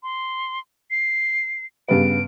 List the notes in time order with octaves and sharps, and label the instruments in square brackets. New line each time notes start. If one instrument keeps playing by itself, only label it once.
[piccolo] C6
C7
[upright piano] G2 C#3 B3 [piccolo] D7